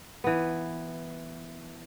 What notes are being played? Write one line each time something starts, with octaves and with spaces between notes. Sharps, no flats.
E3 B3